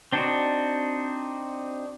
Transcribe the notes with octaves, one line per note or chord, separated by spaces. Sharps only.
C4 D4 D#4 F#4